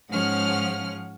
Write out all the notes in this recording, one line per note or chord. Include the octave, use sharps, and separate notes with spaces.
G#2 F3 C#4 F#5 F6